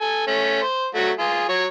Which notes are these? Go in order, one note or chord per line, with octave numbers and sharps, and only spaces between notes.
A4 G#5
A3 C#4
C5
F#3 A3 F#4
F4 G#4
F#3 C#5